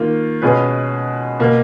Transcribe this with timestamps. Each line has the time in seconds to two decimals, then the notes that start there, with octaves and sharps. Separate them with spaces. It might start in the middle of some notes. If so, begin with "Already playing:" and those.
Already playing: D#3 A#3 F4
0.42 B2 G#3 C#4 G#4 B4
1.39 B2 A#3